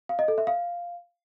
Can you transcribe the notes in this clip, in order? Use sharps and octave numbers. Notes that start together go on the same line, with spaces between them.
F5
D#5
A4
E5
F5